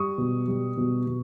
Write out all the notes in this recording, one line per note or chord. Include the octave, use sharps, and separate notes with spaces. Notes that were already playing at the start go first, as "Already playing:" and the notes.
Already playing: G3 C#6 D#6
B2
G3
B2
B2